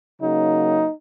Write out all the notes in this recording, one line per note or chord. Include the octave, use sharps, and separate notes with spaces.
C#3 F#3 A#3 D#4